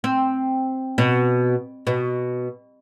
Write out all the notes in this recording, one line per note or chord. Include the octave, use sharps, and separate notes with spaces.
C4
B2
B2